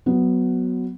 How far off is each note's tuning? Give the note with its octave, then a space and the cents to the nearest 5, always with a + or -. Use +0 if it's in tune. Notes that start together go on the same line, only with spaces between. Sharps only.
F#3 +0 B3 +5